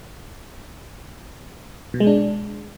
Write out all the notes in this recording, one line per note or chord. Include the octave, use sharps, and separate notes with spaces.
B2
G#3
D4